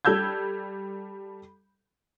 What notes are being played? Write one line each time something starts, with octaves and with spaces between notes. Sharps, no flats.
G3 A4 E6 G6 G#6